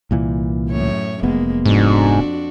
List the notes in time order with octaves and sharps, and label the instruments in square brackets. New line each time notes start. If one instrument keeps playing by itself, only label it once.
[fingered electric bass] C2 A#2 E3
[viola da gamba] F#2 A2 C#5
[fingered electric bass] F1 B3 [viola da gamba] G#3 A#3
[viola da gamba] F2 D4 F#4 [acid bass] G#2